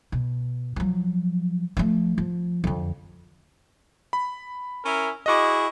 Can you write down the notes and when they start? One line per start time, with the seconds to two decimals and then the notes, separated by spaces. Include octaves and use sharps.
0.12 B2
0.76 F3 F#3
1.77 F3 A3
2.18 F3
2.64 F2 D3
4.13 B5
4.84 C#4 E4 A#4
5.26 E4 F#4 G#4 D#5 D6